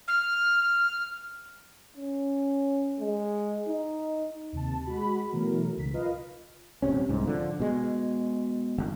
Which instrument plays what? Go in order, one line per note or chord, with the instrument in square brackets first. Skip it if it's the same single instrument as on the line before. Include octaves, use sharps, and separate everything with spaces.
[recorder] F6
[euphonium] C#4
G#3
D#4
[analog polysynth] D#2 C3 A5
G#3 F#4 B5
B2 E3 F#3 A3 A#4
C#2 G#2 B6
F4 A#4 B4 D#5 F5
[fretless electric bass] D#1 A#1 C3 C#4
C2 G#2
D3 F3
B2 G#3
G1